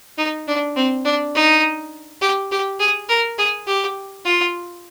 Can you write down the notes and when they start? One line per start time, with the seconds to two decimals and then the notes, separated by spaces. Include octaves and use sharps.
0.18 D#4
0.47 D4
0.76 C4
1.05 D4
1.35 D#4
2.22 G4
2.52 G4
2.80 G#4
3.09 A#4
3.38 G#4
3.67 G4
4.25 F4